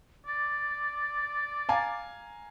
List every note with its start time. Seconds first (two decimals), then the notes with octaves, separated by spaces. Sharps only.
0.26 D5 A6
1.69 F5 G#5 A#5